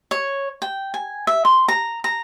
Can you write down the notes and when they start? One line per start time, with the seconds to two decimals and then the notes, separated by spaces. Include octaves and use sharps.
0.11 C#5
0.62 G5
0.94 G#5
1.27 E5
1.45 C6
1.68 A#5
2.04 A#5